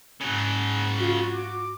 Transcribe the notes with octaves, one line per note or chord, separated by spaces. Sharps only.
G#2 C#3 F#3
F4 F#4
D6